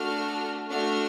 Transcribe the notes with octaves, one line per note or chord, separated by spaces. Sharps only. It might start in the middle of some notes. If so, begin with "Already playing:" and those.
Already playing: A3 D4 F#4 A4 F6
A3 D4 F#4 F6